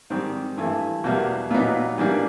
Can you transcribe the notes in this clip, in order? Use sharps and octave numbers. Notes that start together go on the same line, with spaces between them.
G#2 D#3 G3 C4
G2 E3 A3
E2 B2 G3 A#3
A#2 F#3 B3 D#4
G#2 E3 G3 A#3 D4